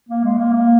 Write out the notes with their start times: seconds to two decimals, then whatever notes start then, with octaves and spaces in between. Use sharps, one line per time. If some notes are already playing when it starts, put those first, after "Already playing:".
0.09 A#3
0.24 G#3
0.39 A#3
0.53 A#3